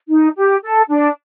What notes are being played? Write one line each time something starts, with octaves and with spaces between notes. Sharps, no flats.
D#4
G4
A4
D4